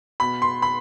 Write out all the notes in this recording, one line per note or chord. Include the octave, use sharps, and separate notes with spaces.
B2 B5
C6
B5